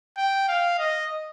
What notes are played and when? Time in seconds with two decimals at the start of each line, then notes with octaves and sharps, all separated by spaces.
0.17 G5
0.48 F5
0.79 D#5